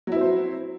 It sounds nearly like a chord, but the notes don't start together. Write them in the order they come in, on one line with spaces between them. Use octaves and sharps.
F#3 E4 C4 C5